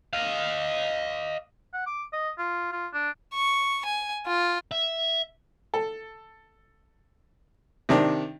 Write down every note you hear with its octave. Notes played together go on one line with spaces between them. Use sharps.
D#5 F5
F#5
D6
D#5
F4
F4
D4
C#6
G#5
F4
E5
A4
C3 D#3 D4